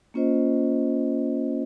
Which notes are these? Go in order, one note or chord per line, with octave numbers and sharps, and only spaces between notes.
A#3 C#4 F4 C5 D#5